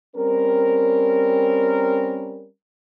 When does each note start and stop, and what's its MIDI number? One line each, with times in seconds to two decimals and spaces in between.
0.15 2.46 55
0.15 2.46 60
0.15 2.46 61
0.15 2.46 70